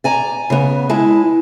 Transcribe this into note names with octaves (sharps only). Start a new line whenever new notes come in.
D5 G#5 A#5
C#3 B3
G#3 E4 A5